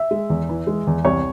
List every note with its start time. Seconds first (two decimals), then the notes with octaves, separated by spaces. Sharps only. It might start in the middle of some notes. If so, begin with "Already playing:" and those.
Already playing: E5
0.11 G#3
0.30 E2
0.49 E3
0.67 G#3
0.87 E2
1.05 C2 C#5